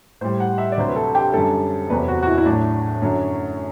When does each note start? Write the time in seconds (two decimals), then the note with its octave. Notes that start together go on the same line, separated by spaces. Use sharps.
0.21 A2 G3 C5
0.40 F#5
0.58 E5
0.72 D5
0.77 D2 C3 F#3 C5
0.88 B4
0.96 A4
1.15 G4
1.33 F#2 D3 G3 A4
1.90 E2 C3 F#3 B4
2.08 F#4
2.22 F#4
2.27 E4
2.38 E4
2.46 A2 F#3 D4
3.02 F#2 D3 F#3